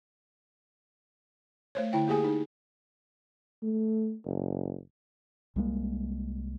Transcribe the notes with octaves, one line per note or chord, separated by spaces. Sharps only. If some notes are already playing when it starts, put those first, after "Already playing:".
A3 C5 C#5
D3 E4 G5
A#3 G4 G#4 G#5
D#4
A3
F#1
C2 G3 G#3 A#3